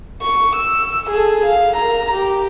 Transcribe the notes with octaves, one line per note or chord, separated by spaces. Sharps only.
C#6
E6
G#4 A4
F5
A#4 A#5
G4